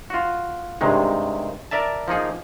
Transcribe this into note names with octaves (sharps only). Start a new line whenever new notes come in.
F4 F#4
G2 C3 D#3 G#3
A#4 D5 E5 A5
F3 A#3 D#4 G#4